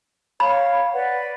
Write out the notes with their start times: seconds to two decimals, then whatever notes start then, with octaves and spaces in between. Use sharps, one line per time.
0.40 C#5 F5 B5
0.94 B4 D5 F#5